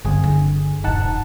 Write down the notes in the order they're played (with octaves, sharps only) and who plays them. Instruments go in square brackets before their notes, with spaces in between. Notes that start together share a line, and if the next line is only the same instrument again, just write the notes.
[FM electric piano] G1 G#4 [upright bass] C4
[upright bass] D3
[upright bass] D#1 G2 [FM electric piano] D#4 F#5 A5